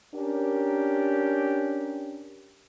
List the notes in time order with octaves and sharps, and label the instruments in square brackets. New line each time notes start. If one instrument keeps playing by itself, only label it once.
[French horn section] C#4 D4 G4 A#4